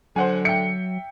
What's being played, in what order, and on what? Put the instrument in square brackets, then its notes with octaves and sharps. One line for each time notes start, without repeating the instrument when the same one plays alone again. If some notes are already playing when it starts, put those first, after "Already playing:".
[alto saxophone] D3 [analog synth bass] F#3 [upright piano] C5 F#5 G#5
[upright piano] E5 G5 [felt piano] C#7